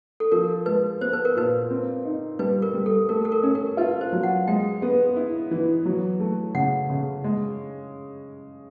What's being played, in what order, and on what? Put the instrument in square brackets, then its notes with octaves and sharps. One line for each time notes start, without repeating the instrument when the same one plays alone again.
[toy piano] A4
[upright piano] F3 [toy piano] A#4
[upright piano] G#3 [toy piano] B4
[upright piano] B3 [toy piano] C5
[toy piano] B4
A#4
[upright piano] A#2 [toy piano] B4
[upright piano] C4
D#4
[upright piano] G3 [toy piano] B4
[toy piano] A#4
[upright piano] G3
[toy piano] A4
[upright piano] A3 [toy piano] A#4
[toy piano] A4
A#4
[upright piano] C#4
[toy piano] A#4
[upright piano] F4 [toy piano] B4
[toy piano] C5
[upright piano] F#3
[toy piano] F#5
[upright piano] G#3 [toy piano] G5
[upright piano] B3
E4
E3
F#3
A3
[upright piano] C#3 [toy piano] F#5
[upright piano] C#3
G#3